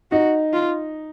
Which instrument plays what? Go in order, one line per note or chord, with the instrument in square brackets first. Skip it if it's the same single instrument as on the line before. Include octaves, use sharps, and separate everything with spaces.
[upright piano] D#4 [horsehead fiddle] F#4
[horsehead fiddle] F4